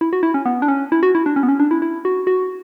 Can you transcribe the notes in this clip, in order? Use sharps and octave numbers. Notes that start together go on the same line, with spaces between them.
E4
F#4
E4
C#4
B3
D4
C#4
E4
F#4
E4
D4
C#4
B3
C#4
D4
E4
E4
F#4
F#4